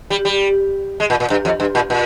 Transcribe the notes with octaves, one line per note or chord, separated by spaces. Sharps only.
G3
G3
G#3
A#2
A#2
G2
F2
G2
A#2
A#2